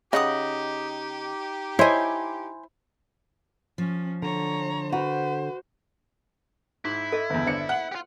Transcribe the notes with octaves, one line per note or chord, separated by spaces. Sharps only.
C#3 D#4 G4 D#5 F#5 D#6
E4 C5 C#5 D#5 G#5
F3 C#4
D3 C#5 A#5
F#4 B4 C5
G#2 E4
A4 D#5 E5
G1 E2
G1 D4 C5 E5 C#7
F#5 F#7
F4 G4